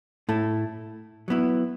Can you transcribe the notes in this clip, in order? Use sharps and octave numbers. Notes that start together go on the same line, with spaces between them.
A2 A3 E4 A4
F#3 B3 E4